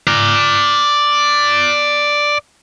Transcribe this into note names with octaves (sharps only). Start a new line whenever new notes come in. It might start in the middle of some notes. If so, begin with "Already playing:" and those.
D5 A#5